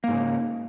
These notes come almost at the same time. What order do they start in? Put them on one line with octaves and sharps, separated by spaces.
A#3 G#2 C#3